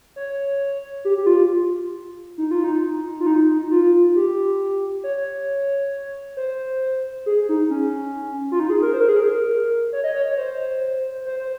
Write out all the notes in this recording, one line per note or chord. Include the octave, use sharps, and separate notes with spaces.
C#5
G4
G4
F4
D#4
F4
D#4
F4
D#4
F4
G4
C#5
C5
G#4
D#4
C#4
F4
D#4
G#4
A#4
C5
A#4
G#4
A#4
C#5
D#5
C#5
C#5
C5
C5
C5